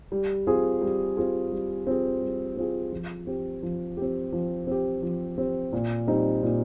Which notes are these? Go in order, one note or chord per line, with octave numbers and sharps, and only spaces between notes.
G3
C4 F4 G#4
G3
C4 F4 G#4
G3
C4 F4 G#4
G3
C4 F4 G#4
F3
C4 G4
F3
C4 G4
F3
C4 G4
F3
C4 G4
A#2
G3 C4 D#4
A#2